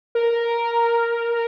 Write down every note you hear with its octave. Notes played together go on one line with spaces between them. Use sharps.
A#4